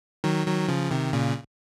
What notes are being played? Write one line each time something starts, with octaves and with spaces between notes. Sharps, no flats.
D#3 F#3
D#3 F#3
C#3 F3
C3 D#3
A#2 C#3